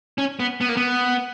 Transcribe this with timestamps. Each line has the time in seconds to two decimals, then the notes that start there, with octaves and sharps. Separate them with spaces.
0.18 C#4
0.40 B3
0.61 B3
0.69 A#3
0.77 B3